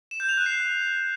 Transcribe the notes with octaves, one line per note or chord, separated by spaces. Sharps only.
E7
G6
F7
F#6
C7